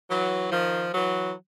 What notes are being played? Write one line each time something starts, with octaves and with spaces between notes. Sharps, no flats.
E3 F#3
D#3 F3
E3 F#3